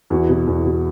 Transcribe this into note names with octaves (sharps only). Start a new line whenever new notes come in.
E2 F#4
B2
E2
B2